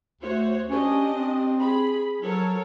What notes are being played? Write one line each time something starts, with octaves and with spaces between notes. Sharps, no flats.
D2 F#4 C5 C#5
C#4 D4 G4 D#5
C4
G#4 B5
F#3 A4 A#4 C#5